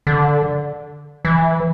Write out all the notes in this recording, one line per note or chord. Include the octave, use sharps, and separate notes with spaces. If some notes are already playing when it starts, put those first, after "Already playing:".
D3
E3